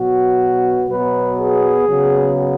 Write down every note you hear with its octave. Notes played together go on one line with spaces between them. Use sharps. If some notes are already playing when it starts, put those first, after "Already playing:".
Already playing: B2 F#3 B3 F#4
B2 F#3 B3 B4
G#4
C#3 F#3 B3